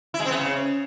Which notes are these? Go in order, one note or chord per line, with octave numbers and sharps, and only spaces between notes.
E4
G#3
C4
B3
C#3